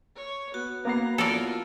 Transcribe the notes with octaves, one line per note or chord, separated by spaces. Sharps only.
C#5
B3 F#4
A#3 B3 A#5 C7
E4 F4 A4 A#4 D5